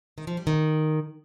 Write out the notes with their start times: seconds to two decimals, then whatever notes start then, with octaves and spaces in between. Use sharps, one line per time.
0.18 D#3
0.27 F3
0.37 G3
0.47 D#3